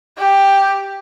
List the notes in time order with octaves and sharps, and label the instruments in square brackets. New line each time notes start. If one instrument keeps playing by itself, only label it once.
[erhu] G4